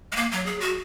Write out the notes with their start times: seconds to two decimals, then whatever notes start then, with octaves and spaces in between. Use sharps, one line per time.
0.12 G#3
0.16 A#3
0.32 F#3
0.46 G#4
0.60 F#4